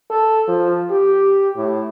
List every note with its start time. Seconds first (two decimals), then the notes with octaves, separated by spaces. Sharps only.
0.10 A4
0.48 F3
0.91 G4
1.57 A2